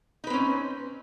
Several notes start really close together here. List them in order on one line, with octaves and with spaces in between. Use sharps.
D#4 B4 C4 C#4